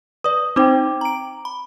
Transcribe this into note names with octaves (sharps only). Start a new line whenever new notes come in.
B4 D5 D#6
C4 D#4 C5 G5 D6
A#5 D7
B5